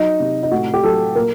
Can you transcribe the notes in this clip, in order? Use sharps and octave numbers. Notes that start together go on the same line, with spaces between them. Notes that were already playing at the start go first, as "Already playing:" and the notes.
Already playing: F#3 D#4
C3
D#4
A2 F#4
G4
F#3 A4
A#2 A#4